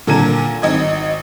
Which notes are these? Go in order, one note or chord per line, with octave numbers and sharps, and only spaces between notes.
A#2 D3 A4 A#4 G#6 D#7
G#1 D#5 G#6